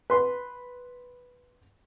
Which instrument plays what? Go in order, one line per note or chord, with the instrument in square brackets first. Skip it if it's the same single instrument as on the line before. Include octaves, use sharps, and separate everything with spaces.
[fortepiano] B4 C6